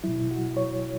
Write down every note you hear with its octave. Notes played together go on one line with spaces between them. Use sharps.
B2 F#3 E4
F#4
C#5